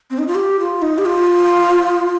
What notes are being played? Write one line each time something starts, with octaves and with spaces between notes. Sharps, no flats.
C4
D#4
F4
G4
F4
D#4
G4
F4